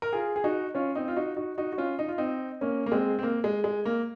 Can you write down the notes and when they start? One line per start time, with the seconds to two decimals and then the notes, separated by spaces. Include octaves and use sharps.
0.02 A#4
0.13 F4 G#4
0.36 G#4
0.44 D#4 F#4
0.75 C#4 F4
0.95 C4 D#4
1.08 F4
1.16 D#4 F#4
1.37 D#4 F#4
1.58 D#4 F#4
1.72 F#4
1.78 C#4 F4
1.99 D#4
2.09 F4
2.18 C4 D#4
2.61 A#3 C#4
2.86 A#3
2.92 G#3 C4
3.19 C4
3.23 A#3
3.44 G#3
3.64 G#3
3.85 A#3